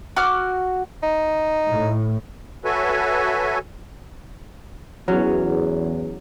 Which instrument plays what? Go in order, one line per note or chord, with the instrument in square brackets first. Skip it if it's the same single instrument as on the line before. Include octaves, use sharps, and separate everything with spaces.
[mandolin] F#4 D6 F6
[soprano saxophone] D#4
[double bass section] A2
[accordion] F#4 A4 B4 C#5 E5 G#5
[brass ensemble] E2 [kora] F#3 C#4